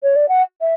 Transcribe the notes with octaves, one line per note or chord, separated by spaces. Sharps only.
C#5
D5
F#5
E5